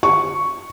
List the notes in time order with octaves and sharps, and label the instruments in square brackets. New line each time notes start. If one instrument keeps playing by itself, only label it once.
[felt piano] C#6